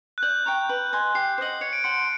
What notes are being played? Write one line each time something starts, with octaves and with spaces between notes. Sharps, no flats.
F#6
D5 G6
G5 A#5 C#6
B4
D#5 G#5 C6
G4 C7
C5 D#5 F#5
C#5 C#7
D7
F#5 A5 C6 C#7